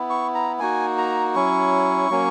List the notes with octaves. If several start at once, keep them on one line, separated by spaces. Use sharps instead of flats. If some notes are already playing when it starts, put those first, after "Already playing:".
Already playing: B3 E4
C#6
A#5
A#3 D#4 F#4 G#5
A#5
F#3 C#4 E4 C#6
F#3 A#3 C#4